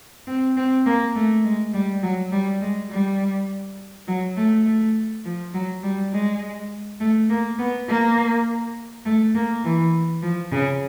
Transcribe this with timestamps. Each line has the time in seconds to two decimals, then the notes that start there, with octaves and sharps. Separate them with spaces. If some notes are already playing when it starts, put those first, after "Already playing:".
0.27 C4
0.57 C4
0.86 A#3
1.15 A3
1.44 G#3
1.73 G3
2.03 F#3
2.32 G3
2.61 G#3
2.90 G3
4.08 F#3
4.37 A3
4.66 A3
5.25 F3
5.54 F#3
5.83 G3
6.12 G#3
7.00 A3
7.30 A#3
7.59 B3
7.88 A#3
9.05 A3
9.35 A#3
9.64 E3
10.22 F3
10.52 C#3